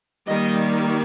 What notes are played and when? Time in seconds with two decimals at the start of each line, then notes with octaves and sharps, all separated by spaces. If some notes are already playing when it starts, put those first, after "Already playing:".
0.27 D#3 G3 A#3 D#5